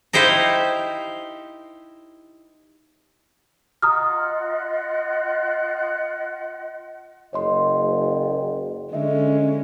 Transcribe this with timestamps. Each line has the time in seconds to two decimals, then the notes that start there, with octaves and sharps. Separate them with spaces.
0.13 D#4 E4 G4 C5 D#5 F5
3.82 F4 D#5 F#5 A#5 D#6 F6
7.33 F#1 C#5 D#5 C6
8.93 D3 G#3 C#4 D#5 E5